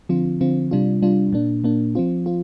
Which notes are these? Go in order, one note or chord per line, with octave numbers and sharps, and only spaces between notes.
D3 F3 C4 F4
D3 F3 C4 F4
C3 G3 D4 F4
C3 G3 D4 F4
A#2 A#3 D4
A#2 A#3 D4
F3 C4 F4
C4 F4